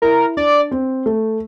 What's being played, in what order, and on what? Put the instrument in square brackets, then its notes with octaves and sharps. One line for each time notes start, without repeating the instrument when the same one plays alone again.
[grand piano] E4 [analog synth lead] A#4
[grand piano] D4 [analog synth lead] D5
[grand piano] C4
A3